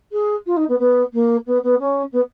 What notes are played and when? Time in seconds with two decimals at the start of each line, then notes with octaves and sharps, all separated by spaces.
0.12 G#4
0.46 F4
0.56 D#4
0.68 B3
0.79 B3
1.13 A#3
1.46 B3
1.63 B3
1.79 C#4
2.12 B3